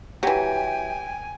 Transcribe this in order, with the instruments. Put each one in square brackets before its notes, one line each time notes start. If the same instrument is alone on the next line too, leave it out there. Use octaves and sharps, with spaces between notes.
[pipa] E3 F#3 [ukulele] G4 [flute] G5 [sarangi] G#5